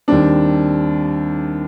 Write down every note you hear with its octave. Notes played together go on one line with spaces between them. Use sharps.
D#2 D#3 G3 C4 D4